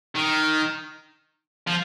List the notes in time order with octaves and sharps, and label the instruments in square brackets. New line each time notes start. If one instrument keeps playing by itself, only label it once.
[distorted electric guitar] D#3
F3